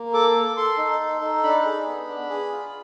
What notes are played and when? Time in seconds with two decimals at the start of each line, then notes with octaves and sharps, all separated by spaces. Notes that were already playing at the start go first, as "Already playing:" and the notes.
Already playing: A#3
0.14 A4 D6
0.35 A4
0.57 A4 C6
0.78 D#4
1.00 A4
1.21 D#4
1.43 D4 B5
1.65 G#4
1.87 B3
2.08 D4
2.30 G#4
2.52 F4